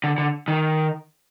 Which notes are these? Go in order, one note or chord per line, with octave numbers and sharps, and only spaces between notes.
D3
D3
D#3